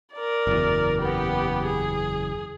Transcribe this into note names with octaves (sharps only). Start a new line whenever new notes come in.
A#4 D5
F#1 E2
B3 G4
G#4